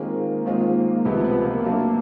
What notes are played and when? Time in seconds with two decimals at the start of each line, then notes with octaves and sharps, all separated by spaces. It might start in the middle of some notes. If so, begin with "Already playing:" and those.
Already playing: D#3 G#3 A#3 C4 F4 G#4
0.45 D#3 G#3 C4 F4 G#4
1.05 C#2 C3 F3 A3 B3
1.24 B3
1.44 A#3
1.64 F#3 A3 D4